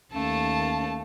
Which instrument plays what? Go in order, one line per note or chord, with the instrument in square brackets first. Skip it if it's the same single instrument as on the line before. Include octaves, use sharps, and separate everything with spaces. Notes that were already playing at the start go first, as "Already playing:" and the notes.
[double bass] D#2 [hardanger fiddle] A3 F5 [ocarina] C#4 [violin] A5